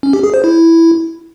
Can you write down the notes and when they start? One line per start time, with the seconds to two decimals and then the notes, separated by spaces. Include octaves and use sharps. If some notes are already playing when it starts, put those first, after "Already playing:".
0.03 C#4
0.13 G4
0.23 G#4
0.34 C5
0.44 E4